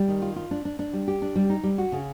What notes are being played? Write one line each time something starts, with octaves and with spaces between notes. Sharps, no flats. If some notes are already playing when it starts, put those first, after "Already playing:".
Already playing: G3
D#3
F4
F4
D4
D4
D4
G3
G4
D4
G3
D#4
G3
F#4
C#3